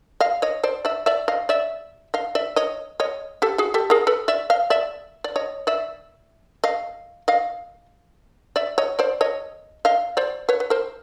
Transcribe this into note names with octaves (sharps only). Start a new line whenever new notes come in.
D#5 F5
C#5 D#5
C5 D5
D5 E5
D5 E5
D#5 F5
D5 E5
D#5 F5
D5 E5
C#5 D#5
C#5 D#5
G4 A4
F#4 G#4
G4 A4
G#4 A#4
A4 B4
D5 E5
D#5 F5
D5 E5
D5
C#5 D#5
D5 E5
D#5 F5
D#5 F5
D5 E5
C#5 D#5
C5 D5
C#5 D#5
D#5 F5
C5 D5
B4 C#5
B4
A#4 C5